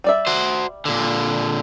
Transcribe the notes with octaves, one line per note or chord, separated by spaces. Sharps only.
G3 D5 E5
F#4 C5
A#2 D3